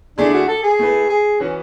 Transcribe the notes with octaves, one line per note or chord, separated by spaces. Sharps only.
D3 A3 D4 E4 G#4 D5
F#4
A4
G#4
A3 E4 B4
G#4
E3 B3 C#4 F#4